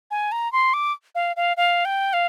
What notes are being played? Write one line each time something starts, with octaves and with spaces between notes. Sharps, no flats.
G#5
A#5
C6
D6
F5
F5
F5
G5
F5